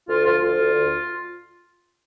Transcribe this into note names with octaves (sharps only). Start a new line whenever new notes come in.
D2 F4
F3 F4
D2 F4
D2
D2